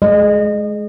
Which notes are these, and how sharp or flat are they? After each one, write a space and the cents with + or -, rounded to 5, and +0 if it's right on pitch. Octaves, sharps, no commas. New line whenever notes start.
G#3 +20 D#5 -25